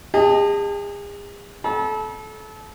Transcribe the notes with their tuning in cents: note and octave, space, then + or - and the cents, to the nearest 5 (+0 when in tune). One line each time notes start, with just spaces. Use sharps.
G#4 -40 D#5 +0 A5 +15
A4 -30 B5 -45